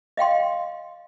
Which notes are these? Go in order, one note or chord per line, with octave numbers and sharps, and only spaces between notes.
D#5 F5 G5 C6